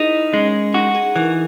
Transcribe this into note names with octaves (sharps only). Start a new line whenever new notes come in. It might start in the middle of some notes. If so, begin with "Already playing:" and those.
Already playing: D#4 E4 G#4 A#4
G#3 C#4
D#4 F#4
G#4
E3 A#4